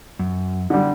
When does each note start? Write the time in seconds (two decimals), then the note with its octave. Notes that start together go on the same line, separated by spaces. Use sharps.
0.19 F#2
0.70 D3 G3